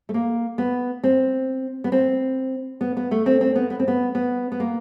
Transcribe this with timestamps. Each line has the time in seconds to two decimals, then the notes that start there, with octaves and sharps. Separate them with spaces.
0.09 A3
0.14 A#3
0.58 B3
1.04 C4
1.84 B3
1.92 C4
2.81 B3
2.97 B3
3.11 A3
3.26 C4
3.41 C4
3.56 B3
3.70 B3
3.80 C4
3.88 B3
4.15 B3
4.52 B3
4.60 A#3